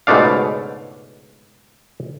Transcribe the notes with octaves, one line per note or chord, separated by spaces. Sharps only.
C#2 G#2 B2 A3 D4 F5